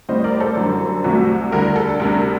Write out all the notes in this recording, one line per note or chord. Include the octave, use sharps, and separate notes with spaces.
A2 G3 C4 C5 D#5
A#4 D5
A4 C5
F#2 D3 G3
C2 C3 F#3 A3
D2 D3 G3 A#4
A4
D2 C3 G3 A#4